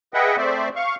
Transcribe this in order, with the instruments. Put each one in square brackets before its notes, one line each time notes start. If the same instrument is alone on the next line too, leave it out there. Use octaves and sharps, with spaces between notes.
[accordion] G#4 B4 D#5 E5 F#5 G5
A3 C4 C5 D5 E5
F5 C#6